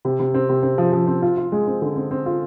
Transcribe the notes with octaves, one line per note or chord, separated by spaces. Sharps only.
C3
C3
C4
C3
C4
F3
F3
C4
F4
F4
G#3
C4
D3
C4
C4
F4